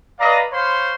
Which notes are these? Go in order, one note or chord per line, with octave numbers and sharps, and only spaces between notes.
B4 D5 D#5 F5 A#5
C5 C#5 F5 B5 C6